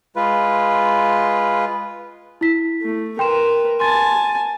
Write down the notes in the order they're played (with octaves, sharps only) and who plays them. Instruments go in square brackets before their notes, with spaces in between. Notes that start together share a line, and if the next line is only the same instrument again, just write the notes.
[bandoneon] G#3 F4 B4
[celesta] E4 B6
[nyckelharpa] A3
[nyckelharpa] A#4 B4 [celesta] G5 C6 E7
[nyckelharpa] G#5 A5 [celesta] C6 A6